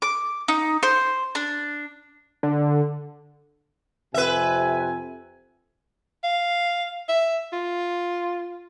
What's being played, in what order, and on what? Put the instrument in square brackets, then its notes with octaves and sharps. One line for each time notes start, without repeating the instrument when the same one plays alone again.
[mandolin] D6
D#4
C5
D4
[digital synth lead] D3
[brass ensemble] F2 C3 G#5 [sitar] B4 E5
[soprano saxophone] F5
E5
F4